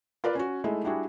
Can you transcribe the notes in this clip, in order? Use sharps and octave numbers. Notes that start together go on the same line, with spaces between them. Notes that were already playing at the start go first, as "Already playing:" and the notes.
F4 A#4 B4 D5
C#4 F#4
G#3 A3 D#4 E4
G3 D4 E4 F#4 G#4